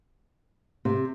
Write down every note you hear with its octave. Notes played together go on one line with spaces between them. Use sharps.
C3